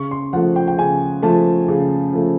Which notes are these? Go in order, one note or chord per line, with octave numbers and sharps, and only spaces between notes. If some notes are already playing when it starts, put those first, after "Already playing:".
Already playing: C#3 C#6
C6
F3 A3 F#5
G5
G5
C#3 G#5
F3 A3 A5
C#3
F3 A3